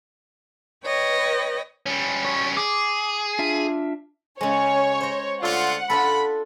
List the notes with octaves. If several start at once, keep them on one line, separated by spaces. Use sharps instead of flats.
B4 C#5 D#5 G5
G3 C#4
C#5
G#4 D6
D4 F4 E5
C#3 G#3 C#5
C5 A#5
D3 A3 F4 F#5
D4 F4 A4 B5